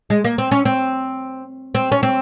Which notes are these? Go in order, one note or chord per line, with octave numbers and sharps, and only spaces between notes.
G#3
A#3
C4
C#4
C4
C4
C#4
C4